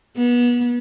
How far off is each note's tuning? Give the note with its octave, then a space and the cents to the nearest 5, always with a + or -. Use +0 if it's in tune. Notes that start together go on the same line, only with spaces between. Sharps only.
B3 -30